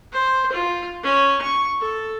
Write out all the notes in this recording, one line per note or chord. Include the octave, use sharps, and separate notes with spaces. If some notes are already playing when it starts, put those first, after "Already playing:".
C5
F4
C#4
C#6
A4